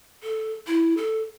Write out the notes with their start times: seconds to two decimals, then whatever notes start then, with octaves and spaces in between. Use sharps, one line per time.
0.23 A4
0.67 E4
0.97 A4